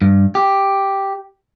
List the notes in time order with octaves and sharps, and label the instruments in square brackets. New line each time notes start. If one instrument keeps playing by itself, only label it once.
[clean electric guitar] G2
G4